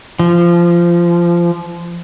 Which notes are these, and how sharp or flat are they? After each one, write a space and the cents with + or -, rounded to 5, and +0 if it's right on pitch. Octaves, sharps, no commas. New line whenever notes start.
F3 -20